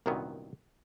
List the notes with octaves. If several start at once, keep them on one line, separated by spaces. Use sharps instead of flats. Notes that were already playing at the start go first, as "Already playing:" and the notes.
C2 F#2 A#2 D#3 F#3 B3